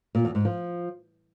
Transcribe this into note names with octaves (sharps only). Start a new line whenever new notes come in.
A#2
E2
G#2
F3